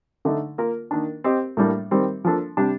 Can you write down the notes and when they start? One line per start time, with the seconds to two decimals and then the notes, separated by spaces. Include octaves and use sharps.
0.25 D3 A3 D#4
0.58 A#3 F4 A#4
0.91 D#3 A#3 D4
1.24 C4 G4 C5 D#5
1.57 A2 G3 A#3 D4
1.91 D#3 G3 C4 G4
2.25 F3 A#3 D4 A4
2.57 C3 G3 D4 G4